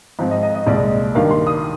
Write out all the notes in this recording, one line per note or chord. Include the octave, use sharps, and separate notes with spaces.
G#2 F3 C4
D#5
D#5
D#5
C2 A#2 G#3 D5
G2 D#3 A#3 D4 F5
C6
D#6